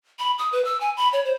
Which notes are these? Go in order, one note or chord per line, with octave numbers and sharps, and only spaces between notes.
B5
D#6
B4
E6
G#5
B5
C#5
C5